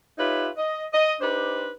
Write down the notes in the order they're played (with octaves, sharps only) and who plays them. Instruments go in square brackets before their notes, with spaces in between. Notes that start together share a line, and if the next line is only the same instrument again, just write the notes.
[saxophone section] D#4 F4 G4 B4 C#5 E5
D#5
D#5
D4 D#4 G4 B4 C5